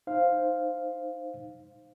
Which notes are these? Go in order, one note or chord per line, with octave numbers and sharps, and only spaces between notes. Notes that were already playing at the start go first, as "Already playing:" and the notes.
D#4 C5 F5